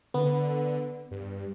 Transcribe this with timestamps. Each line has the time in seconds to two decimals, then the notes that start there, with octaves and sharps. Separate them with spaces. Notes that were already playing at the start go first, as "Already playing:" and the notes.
0.14 D3 B3
1.11 G2